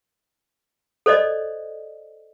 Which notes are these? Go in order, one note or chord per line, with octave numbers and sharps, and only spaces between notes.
A4 C5 D5 D#5